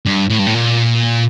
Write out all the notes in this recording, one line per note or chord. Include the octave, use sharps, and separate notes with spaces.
G2
A2
G2
A2
A#2